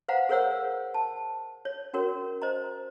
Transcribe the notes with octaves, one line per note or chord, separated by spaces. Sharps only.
B4 C5 F5 F#5 A#5
G#4 A#4 C5 C#5 F#5 E6
A5
C#5
C#4 F#4 A#4 C#5
C5 D#5 A#5